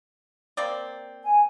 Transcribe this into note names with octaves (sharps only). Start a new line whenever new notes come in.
A#3 C4 D5
G#5